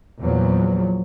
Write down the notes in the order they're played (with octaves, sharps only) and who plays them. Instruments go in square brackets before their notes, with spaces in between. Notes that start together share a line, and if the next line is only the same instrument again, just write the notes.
[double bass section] E2 A#2 F3 F#3